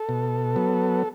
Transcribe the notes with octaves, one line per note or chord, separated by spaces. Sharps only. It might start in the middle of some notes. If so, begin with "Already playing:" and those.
Already playing: A4
B2
F#3 B3